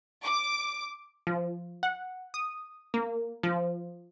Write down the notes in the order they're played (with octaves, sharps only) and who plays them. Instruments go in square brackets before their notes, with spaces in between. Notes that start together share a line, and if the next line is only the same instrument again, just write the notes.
[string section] D6
[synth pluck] F3
F#5
D#6
A#3
F3